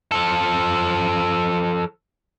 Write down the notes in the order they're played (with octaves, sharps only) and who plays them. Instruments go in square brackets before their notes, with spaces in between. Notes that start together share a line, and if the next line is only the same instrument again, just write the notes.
[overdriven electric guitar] F3 A4